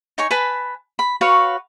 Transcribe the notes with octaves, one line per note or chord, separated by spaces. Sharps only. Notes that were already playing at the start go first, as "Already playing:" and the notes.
D#4 C#5 G#5
B4 G#5 A5 B5
B5
F#4 B4 C#5 F5